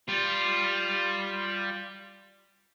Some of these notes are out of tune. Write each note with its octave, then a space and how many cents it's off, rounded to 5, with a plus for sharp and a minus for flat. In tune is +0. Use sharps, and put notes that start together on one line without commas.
G3 +0 F4 +0